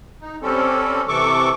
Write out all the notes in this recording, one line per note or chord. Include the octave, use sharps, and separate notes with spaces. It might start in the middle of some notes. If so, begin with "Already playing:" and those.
D#4
G3 C4 C#4 A4
C3 E3 A4 C#6 D6